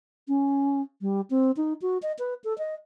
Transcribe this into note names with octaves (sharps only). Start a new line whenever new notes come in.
C#4
G3
C4
D#4
F#4
D#5
B4
A4
D#5